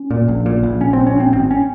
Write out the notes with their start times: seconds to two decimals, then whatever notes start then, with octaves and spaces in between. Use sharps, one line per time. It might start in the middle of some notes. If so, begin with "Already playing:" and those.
Already playing: C#4
0.11 A#2
0.28 A#1
0.46 A#2
0.63 A#1
0.81 A#1 C#4
0.93 C4
0.98 A#1
1.07 C#4
1.15 A#1 C4
1.33 G#1 C4
1.51 C#4